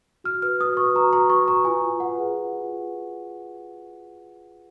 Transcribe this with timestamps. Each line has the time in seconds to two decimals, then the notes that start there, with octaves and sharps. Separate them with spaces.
0.24 F#4 F6
0.42 B4 F6
0.60 F#4 D#6
0.77 B4 C#6
0.95 F#4 A#5
1.13 B4 A#5
1.30 F#4 C#6
1.48 B4 A#5
1.65 F4 G#5
1.84 F4
2.00 B4 F#5
2.18 G#4
2.36 F4
2.53 F4
2.71 B4
2.88 G#4